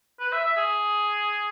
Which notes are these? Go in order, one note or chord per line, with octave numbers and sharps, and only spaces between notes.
B4
E5
E5
G#4